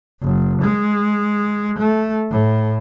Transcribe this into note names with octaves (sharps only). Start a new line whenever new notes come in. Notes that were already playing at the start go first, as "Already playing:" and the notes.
F#1
G#3
A3
A2